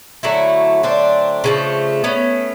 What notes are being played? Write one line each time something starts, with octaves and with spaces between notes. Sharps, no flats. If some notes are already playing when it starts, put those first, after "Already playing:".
D3 F#3 A3 E4 F#4
C4 D4
C#3 F3 A3
B3 C#4